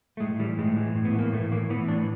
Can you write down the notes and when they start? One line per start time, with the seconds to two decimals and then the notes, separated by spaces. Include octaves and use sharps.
0.17 A3
0.20 A2 G#3
0.39 E3 G3
0.59 A2 G#3
0.77 E3
0.96 A2
1.05 B3
1.14 E3 A#3
1.32 A2 A3
1.52 E3 A#3
1.70 E3 B3
1.88 A2 D4